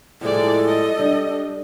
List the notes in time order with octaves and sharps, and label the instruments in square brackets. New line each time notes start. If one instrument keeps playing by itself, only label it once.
[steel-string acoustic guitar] A2 F3 G3 [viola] G#3 D5 [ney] A4
[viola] D#5
[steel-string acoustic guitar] G3 [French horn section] D4